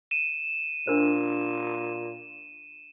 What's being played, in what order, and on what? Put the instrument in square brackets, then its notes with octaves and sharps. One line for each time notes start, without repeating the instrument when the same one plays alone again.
[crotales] D#7 E7
[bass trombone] A#2 [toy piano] D4 A#4 C5